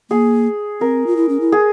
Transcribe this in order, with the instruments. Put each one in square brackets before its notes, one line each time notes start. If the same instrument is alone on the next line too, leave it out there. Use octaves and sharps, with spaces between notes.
[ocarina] A#3 [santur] G#4
[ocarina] C4 [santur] A#4
[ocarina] F4
E4
C#4
E4
[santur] G#4